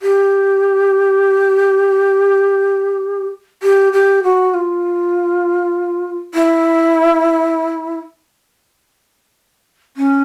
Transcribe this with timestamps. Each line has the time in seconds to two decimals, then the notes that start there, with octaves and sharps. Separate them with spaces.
0.02 G4
3.62 G4
3.93 G4
4.23 F#4
4.54 F4
6.34 E4
9.96 C#4